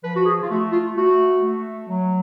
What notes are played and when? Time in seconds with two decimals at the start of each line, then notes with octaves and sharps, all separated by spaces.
0.04 F3 B4
0.16 F#4
0.26 G#4
0.43 F4
0.50 A3 F#4
0.73 F4
0.96 A3 F#4
1.42 A3
1.88 F#3